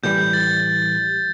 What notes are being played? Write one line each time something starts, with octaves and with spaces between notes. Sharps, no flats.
A2 E3 G3 G6
A6